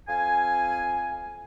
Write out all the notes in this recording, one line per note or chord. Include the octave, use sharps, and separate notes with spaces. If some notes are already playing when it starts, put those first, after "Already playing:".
F2 F5 G#5